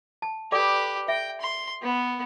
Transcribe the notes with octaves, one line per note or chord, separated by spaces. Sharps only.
A5
G4 A4 B4 D5 D6
E5 G5
C6
B3